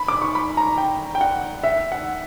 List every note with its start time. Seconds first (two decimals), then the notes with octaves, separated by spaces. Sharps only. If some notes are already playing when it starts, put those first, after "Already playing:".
Already playing: B5
0.08 D6
0.22 C#6
0.35 B5
0.57 A#5
0.78 G5
1.15 G5
1.21 F#5
1.63 E5
1.92 F#5